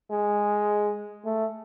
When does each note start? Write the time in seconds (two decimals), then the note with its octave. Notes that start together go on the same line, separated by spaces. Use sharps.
0.11 G#3
1.25 A3